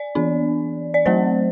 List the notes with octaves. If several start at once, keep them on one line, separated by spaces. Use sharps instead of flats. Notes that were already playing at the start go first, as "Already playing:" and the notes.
Already playing: D5
E3 B3 D4
D5
F#3 A3 C4 C5